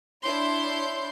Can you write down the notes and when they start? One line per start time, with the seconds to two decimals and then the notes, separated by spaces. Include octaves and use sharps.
0.22 D4 E4 C#5 C6 G6